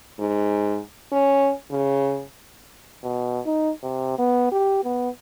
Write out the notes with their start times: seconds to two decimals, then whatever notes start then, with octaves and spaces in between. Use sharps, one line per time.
0.19 G#2
1.12 C#4
1.71 C#3
3.04 B2
3.46 D#4
3.83 C3
4.18 B3
4.52 G4
4.84 B3